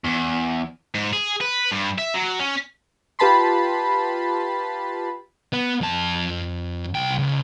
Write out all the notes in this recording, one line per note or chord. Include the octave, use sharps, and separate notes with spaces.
E2
G#2
G#4
B4
G2
E5
F#3
C#4
F4 G4 B4 A5 B5 C6
B3
F2 A5
C2 G5
C#2